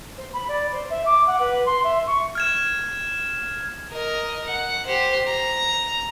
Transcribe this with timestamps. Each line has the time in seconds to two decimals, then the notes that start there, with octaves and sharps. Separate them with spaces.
0.17 C5
0.33 B5
0.48 D5
0.72 C5
0.90 E5
1.05 D6
1.27 F#5
1.39 B4
1.66 C6
1.84 E5
2.07 C#6
2.35 F6 G#6 E7
3.92 A#4 D#5
4.45 F#5
4.87 G4 C5
5.28 A#5